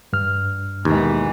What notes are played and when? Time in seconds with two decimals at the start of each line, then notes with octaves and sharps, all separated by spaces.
0.13 G2 F6
0.85 D#2 B2 E3 G#3